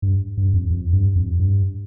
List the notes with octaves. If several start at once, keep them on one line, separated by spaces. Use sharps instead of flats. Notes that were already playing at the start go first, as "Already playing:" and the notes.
G2
G2
F2
F2
G2
F2
G2